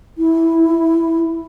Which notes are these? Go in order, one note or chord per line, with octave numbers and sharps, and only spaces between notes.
E4